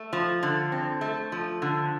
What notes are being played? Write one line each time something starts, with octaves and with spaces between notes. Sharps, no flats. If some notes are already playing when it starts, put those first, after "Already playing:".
Already playing: A3
F3
D3
C4
A3
F3
D3